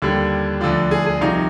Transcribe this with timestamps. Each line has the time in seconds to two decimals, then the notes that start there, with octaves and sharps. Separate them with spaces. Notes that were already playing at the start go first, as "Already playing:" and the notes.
0.02 D#2 D3 G3
0.61 D2 D3 F3 D5
0.91 G#4
1.06 G#4
1.21 C2 C3 F3 D#4